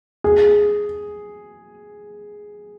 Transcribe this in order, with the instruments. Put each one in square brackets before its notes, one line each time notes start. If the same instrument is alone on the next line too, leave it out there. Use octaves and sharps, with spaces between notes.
[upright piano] G#4